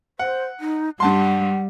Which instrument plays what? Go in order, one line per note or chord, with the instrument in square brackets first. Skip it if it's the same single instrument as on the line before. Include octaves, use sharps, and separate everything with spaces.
[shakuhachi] C5 [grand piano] F#5
[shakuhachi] D#4
[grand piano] G2 A5 C6 [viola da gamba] G3 [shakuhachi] F#5